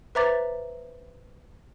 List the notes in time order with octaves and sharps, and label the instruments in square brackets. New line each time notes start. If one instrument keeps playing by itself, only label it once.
[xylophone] B4 C5 E5 A#5 D6 A6